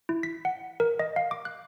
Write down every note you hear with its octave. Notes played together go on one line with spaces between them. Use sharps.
E4
B6
F#5
A#4
D#5
F5
D6
F#6